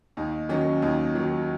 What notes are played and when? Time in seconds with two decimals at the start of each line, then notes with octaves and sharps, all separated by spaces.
0.17 D#2 D#4
0.49 D#3 F#3 C#4
0.82 D#2 D#4
1.15 D#3 F#3